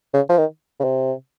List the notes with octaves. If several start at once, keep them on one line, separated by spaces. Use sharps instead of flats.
C#3
F3
D#3
C#3
C3